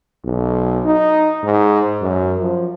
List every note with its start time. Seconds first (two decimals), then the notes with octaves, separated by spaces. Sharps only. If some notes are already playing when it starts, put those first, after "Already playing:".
0.24 B1
0.85 D#4
1.43 G#2
2.02 F#2
2.40 F3